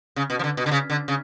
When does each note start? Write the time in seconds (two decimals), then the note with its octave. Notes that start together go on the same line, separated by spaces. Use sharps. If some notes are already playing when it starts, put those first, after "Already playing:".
0.16 C#3
0.30 B2
0.39 F3
0.44 D3
0.57 B2
0.66 D3
0.71 C#3
0.90 D3
1.08 C#3